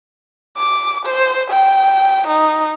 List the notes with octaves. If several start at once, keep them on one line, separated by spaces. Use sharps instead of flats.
D6
C5
G5
D#4